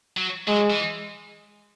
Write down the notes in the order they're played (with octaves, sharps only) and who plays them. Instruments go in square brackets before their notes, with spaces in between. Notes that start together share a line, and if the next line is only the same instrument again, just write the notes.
[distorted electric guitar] F#3
[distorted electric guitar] F#3 [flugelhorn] G#3
[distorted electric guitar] E3